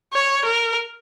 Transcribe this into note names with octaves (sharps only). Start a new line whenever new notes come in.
C#5
A#4